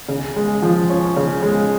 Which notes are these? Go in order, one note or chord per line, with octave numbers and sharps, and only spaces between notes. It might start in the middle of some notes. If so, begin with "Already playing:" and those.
C#3
G#3
F3
C#4
C#3
G#3